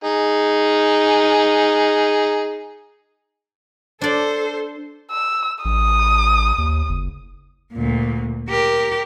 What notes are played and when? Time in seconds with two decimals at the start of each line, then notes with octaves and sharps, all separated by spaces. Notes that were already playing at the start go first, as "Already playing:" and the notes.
0.04 D#4 G#4
4.01 D4 A4 C5 D5
5.11 E6
5.65 A1 D#6
6.58 D#2
6.89 F#1
7.73 D2 A#2
8.49 G4 A#4